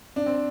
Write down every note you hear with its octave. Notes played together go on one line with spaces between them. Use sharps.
D4
C4